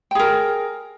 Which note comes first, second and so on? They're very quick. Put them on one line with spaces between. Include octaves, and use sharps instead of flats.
G5 G#4 A#4